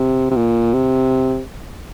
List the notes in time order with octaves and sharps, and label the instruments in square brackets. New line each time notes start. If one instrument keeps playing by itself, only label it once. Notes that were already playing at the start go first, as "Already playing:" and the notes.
Already playing: [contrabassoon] C3
C3
A#2
C3